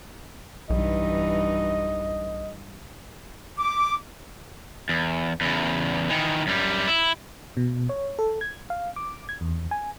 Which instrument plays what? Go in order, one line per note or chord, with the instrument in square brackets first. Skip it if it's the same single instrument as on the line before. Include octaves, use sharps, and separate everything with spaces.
[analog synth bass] B1 [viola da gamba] G2 E3 D#4 [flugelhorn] D#5
[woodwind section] D6
[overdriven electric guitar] E2
E2 C#3
D#3 E3
F#2 G3
E4
[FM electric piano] B2
C#5
A4
G#6
F5
D6
G#6
E2
G#5